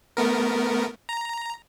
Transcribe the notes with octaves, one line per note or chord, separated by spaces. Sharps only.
A3 B3 A#4
A#5